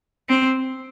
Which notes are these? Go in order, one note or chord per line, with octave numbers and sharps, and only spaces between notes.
C4